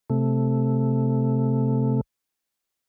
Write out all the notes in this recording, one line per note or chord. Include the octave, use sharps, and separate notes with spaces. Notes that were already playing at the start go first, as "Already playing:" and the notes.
C3 A3